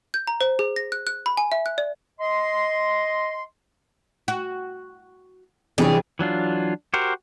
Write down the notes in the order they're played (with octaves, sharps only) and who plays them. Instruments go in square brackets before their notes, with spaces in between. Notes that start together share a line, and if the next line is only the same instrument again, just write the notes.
[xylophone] G6
A#5
C5
G#4
A#6
F#6
F#6
B5
G#5
E5
F#6
D5
[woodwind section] D#5 C6
[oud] F#4
[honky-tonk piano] F2 C3 D4 [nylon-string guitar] E3 C#5 [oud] G3 [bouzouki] G#4
[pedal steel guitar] E3 F#3 D4 F4
F#4 G4 A#4 C5